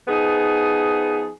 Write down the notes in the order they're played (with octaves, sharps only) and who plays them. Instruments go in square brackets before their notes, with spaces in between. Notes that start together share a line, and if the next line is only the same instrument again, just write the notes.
[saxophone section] F3 B3 D#4 G#4